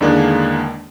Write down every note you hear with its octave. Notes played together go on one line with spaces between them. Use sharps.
E2 D3 D#3 G#3 A#3 D4